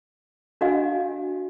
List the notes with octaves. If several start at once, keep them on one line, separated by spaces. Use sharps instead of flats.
D4 F#4 G4 D#5 F5 G#5